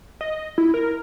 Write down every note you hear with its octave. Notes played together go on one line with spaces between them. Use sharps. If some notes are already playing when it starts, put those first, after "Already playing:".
D#5
E4
A#4